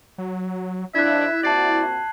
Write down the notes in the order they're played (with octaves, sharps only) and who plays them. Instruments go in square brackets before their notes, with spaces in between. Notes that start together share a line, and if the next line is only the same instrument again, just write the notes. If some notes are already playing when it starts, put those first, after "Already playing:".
[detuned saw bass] F#3
[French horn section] F2 D4 [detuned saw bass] E4 [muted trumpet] E5 [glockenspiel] F#6 G#6
[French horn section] A#2 C4 F#4 [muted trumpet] D5 [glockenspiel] A5 C7 F#7